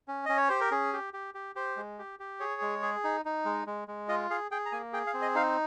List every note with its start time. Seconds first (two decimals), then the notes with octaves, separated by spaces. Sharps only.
0.08 C#4
0.26 C#4 D#5
0.37 C#5
0.48 G4 C5
0.61 A#4
0.71 C#4 G#4
0.93 G4
1.14 G4
1.34 G4
1.56 G4 C5
1.77 G#3
1.99 G4
2.19 G4
2.40 G#4 C#5
2.61 G#3
2.82 G#4
3.04 D#4
3.25 D#4
3.45 G#3
3.67 G#3
3.88 G#3
4.09 F4 D#5
4.30 G#4 F5
4.51 G#4 G5
4.66 A#5
4.72 A#3 G#5
4.93 G#4 G5
5.07 F5
5.14 C4
5.22 D#5
5.35 D#4 F5